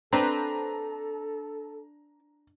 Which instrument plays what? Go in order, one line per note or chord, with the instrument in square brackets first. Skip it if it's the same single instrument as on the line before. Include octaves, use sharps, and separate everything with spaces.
[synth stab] C4 B4 C5 [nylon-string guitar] D4 [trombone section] A4 [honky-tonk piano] A#5